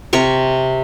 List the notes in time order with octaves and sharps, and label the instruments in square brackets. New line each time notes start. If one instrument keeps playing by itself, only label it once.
[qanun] C3 A#4 C#6